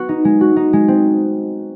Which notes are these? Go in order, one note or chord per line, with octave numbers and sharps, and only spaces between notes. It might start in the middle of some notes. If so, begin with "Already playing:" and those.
Already playing: B3 F#4
D#4
G#3
F#4
D#4
G#3
C4